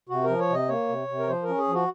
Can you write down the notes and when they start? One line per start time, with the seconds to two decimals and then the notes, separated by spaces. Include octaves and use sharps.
0.09 C3 F#4
0.24 F3 A#4
0.39 C#5
0.49 C3 D#5
0.69 A#3 C#5
0.88 C3
1.08 C3
1.19 A#4
1.28 F3 C5
1.43 A#4
1.48 C#4
1.58 G#4
1.68 F3
1.73 F#4